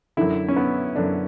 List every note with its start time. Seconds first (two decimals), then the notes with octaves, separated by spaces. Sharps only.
0.17 F#2 D3 E4
0.48 C#4
0.56 B3
0.96 F#2 D3 D4